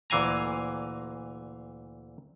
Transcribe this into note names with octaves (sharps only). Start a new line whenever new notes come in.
D2 A#2 E3 F5 G#5 A#5